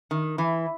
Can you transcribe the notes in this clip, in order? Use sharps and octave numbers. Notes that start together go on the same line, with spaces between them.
D#3
E3